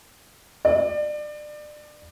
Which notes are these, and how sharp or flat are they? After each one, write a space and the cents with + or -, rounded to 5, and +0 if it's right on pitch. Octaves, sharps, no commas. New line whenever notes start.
D5 +30